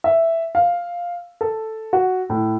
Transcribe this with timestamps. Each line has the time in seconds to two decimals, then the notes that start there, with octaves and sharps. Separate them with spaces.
0.04 E5
0.55 F5
1.41 A4
1.93 F#4
2.30 A2